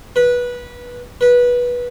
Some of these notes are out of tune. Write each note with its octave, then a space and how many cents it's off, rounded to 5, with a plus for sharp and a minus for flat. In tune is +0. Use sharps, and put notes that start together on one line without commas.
B4 -20
B4 -20